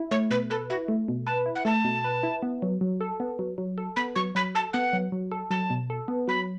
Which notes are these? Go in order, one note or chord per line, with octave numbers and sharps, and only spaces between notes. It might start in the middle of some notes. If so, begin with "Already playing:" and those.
Already playing: E4
A3 C#5
B2 B4
A4 B4
E4 F#4
A3
B2
B4 A5
E4
F#5
A3 A5
B2
B4
E4
B3
F#3
F#3
A4
B3
F#3
F#3
A4
B3 B5
F#3 C#6
F#3 B5
A4 A5
B3 F#5
F#3
F#3
A4
F#3 A5
B2
A4
B3
F#3 B5